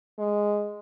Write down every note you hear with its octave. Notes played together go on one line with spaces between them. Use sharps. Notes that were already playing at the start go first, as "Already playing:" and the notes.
G#3